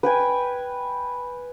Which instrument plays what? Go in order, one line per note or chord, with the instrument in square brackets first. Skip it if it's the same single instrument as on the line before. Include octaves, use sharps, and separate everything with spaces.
[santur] B4 G5 G#5